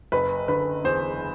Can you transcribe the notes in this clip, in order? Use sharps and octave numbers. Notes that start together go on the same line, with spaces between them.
F#1 B4
D3 B4
E2 C5